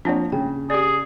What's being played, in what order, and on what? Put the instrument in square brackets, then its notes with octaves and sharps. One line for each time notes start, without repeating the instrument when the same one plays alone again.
[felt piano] F3 C#5 [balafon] A#3 C4 D4
[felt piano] C#3 [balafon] G5
[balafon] G4 D5 [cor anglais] G#4